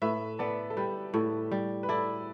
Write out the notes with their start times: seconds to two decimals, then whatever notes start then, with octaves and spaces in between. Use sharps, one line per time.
0.02 A2 B4 E5
0.39 B3 A4 D5
0.70 A4
0.77 G3 G4 B4
1.14 A2 A4
1.51 G3
1.83 B4
1.89 E4 A4 D5